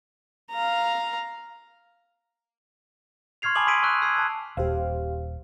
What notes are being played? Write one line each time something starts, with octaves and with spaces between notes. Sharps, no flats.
F5 A#5
C6 C#6 F6 G#6 C7 F7
G#5 A5 B5 D6 D#6 F#7
C6 E6 G#6 B6 D7 D#7
A5 C#6 E6 F#6
E6 G#6 C7
A5 F#6
D#1 G4 C5 F5